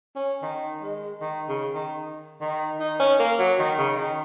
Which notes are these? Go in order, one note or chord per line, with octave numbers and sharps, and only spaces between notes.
C#4
D#3
G#3
D#3
C#3
D#3
D#3
D#4
C#4
A#3
F#3
D#3
C#3
D#3